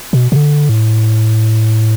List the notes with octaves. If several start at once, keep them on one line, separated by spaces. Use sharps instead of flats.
B2
B2
D3
A2